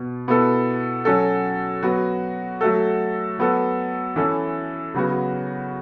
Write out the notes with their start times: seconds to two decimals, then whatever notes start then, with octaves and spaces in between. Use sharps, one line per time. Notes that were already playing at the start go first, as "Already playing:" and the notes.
Already playing: B2 B3
0.28 B2 B3 E4 A4
1.05 F#3 C#4 F#4 A4
1.83 F#3 B3 F#4
2.61 F#3 A3 F#4 A4
3.39 F#3 B3 F#4 A4
4.16 E3 C#4 E4 A4
4.94 C#3 F#3 B3 F#4